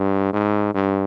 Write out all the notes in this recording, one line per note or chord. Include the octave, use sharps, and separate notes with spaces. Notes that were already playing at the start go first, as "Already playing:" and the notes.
Already playing: G2
G#2
G2